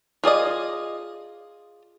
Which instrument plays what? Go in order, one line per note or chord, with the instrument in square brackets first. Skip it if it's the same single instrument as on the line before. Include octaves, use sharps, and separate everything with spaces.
[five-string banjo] F4 G#4 D5 D#5